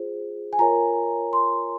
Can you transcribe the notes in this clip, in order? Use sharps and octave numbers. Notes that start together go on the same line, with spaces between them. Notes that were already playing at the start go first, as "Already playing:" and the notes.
Already playing: F4 G#4 C5
G#5
F4 A#4 C#5 A#5
C6